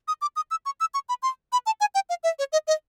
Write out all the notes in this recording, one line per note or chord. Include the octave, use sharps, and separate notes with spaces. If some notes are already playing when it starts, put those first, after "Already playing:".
D#6
D6
D#6
E6
C#6
E6
C#6
B5
C6
B5
A5
G#5
G5
F5
E5
C#5
D#5
D#5